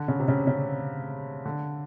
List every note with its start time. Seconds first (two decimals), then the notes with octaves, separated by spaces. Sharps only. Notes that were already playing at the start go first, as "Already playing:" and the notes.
Already playing: D3
0.08 C#3
0.19 C3
0.28 C#3
0.47 C#3
1.46 D3